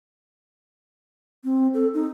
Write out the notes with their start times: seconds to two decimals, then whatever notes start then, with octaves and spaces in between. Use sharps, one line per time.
1.44 C4
1.74 A4
1.94 D#4